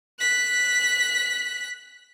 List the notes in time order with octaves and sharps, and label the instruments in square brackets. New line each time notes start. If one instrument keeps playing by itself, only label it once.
[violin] F#6 B6